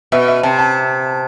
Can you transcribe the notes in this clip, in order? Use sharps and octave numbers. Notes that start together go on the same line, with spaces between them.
B2 E5
E5
C3 A5
A5